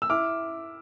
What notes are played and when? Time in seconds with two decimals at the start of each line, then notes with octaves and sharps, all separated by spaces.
0.02 E6
0.10 E4 D6 F6